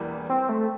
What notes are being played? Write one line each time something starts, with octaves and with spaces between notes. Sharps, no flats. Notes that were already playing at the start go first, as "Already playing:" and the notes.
Already playing: E1 E2 E3 G3 A#3
C4
A3